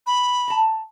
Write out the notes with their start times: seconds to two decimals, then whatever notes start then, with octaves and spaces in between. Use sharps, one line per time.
0.07 B5
0.48 A5 A#5